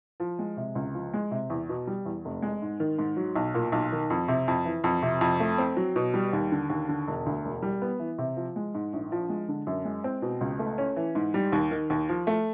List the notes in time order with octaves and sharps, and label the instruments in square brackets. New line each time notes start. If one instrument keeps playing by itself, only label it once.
[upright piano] F3
G#3
C3
C#2
F3
G#3
C3
E2
B2
G3
E2
F1
G#3
G#2
D#3
G#2
F#3
B1
A#2
B1
D#3
F2
C3
F2
E3
F2
C3
F2
A3
C4
F#3
B2
G3
D#2
D3
D#2
D3
E1
D2
E1
G3
B3
E3
C3
F3
G#3
G#2
A#1
F3
G#3
D3
F#2
G#3
C4
B2
C#2
A3
C#4
E3
G#2
G3
D#2
D#3
D#2
F3
A3